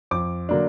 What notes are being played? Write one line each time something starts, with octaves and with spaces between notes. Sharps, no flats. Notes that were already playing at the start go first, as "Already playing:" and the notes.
F2 D6
D3 F#3 A#3 D4